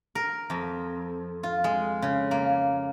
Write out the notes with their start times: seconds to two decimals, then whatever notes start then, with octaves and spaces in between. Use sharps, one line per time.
0.15 A#4
0.50 F2
1.43 F4
1.64 G#3
2.02 C#3
2.31 A#3